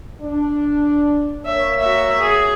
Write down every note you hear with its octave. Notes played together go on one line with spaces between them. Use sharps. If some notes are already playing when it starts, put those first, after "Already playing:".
D4
A#3 C#5 E5
F#4 E5
G#4